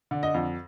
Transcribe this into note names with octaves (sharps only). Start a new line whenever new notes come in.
D3
D#5
F2